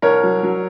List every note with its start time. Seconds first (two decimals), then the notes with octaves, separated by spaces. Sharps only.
0.02 C2 A#4 C#5
0.23 F#3
0.43 F#3